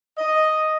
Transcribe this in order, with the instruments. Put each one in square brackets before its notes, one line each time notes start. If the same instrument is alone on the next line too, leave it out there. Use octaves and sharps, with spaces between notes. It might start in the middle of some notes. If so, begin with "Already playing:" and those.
[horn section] D#5